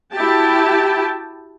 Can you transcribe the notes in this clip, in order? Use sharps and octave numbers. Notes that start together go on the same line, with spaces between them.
E4 F#4 G4 G5 A5